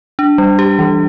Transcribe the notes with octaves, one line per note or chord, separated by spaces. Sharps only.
D4
G3
G4
E3